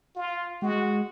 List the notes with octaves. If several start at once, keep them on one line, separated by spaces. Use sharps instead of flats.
F4
G#3 F#4